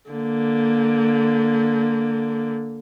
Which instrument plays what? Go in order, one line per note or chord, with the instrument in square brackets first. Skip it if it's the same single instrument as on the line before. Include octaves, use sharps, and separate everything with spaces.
[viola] D3 A#3